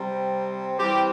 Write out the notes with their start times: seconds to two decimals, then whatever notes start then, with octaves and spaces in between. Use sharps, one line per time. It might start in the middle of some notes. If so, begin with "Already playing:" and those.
Already playing: C3 G3 C4
0.79 E3 G3 C4 G4